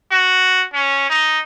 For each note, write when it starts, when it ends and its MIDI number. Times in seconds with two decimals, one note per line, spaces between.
0.11 0.64 66
0.73 1.09 61
1.10 1.39 63